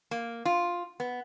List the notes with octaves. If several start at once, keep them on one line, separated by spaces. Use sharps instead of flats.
A#3
F4
B3